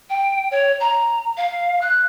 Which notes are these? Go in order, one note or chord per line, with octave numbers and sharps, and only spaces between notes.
G5
C#5
A#5
F5
F#6